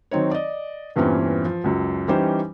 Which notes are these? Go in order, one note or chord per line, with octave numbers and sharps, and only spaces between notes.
D#3 F#3 C4 D#4 C#5
D5 D#5
E2 G2 A#2 E3 C4 C#4
F3
C#2 F#2
E3 G3 C#4 D#4 G4 C5